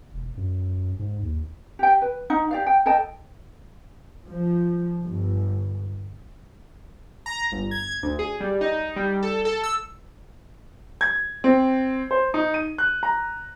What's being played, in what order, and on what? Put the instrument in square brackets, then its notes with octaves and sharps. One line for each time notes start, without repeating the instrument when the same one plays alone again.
[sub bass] E1
F#2
G#2
D#2
[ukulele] G4 G5
B4
D#4 F#5
G4 D5 F5
G5
A4 D#5 G5 A5
[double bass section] F3
G1
[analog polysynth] A#5
G1
G#6
D2
G#4
G3
D#4
G3
A4
A4
E6
[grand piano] G#6
C4
C5
D#4
D#7
F#6
A#5